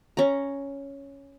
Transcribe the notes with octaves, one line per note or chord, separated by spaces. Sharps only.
C#4 A#5